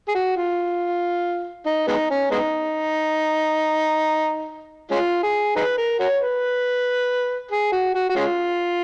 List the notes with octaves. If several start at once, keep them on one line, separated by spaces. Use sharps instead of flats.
G#4
F#4
F4
D#4
G#3 B3 D#4
C#4
G#3 B3 D#4
G#3 C#4 F4
G#4
D#4 G#4 B4
A#4
F#4 A#4 C#5
B4
G#4
F#4
F#4
F#4
G#3 C#4 F4